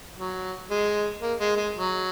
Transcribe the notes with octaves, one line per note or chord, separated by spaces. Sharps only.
F#3
G#3
A#3
G#3
G#3
F#3